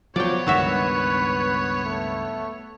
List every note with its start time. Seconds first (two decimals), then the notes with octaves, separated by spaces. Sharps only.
0.16 F3 F#3 B3 C#5 D5 G5
0.47 C#2 G2 D#3 F#3 F#4 B4 E5
1.85 A3